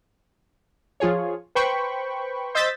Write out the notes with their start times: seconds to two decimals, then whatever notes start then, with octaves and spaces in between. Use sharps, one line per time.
1.00 F3 F4 G#4 C#5
1.55 B4 C5 G5 B5 C#6
2.55 C5 D#5 E6 G6 A6 B6